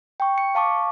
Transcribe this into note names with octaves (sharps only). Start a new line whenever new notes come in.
G5 C#6
C#7
F5 A5 C#6 D6